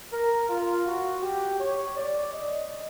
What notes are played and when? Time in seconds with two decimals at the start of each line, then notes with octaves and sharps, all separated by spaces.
0.12 A#4
0.49 F4
0.86 F#4
1.22 G4
1.60 C#5
1.96 D5
2.33 D#5